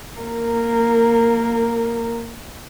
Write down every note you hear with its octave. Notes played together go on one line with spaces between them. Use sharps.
A#3 A#4